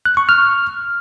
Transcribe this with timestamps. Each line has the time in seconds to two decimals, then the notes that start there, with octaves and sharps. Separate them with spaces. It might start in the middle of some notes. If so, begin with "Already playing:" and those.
0.05 F#6
0.17 C#6
0.29 F6